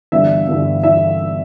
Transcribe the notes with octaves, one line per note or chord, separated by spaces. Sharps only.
G1 G2 E3 E5
G1 G2 E3
E3 E5